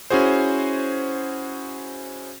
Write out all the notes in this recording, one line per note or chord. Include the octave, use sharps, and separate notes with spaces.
C#4 E4 F#4 G#4 C5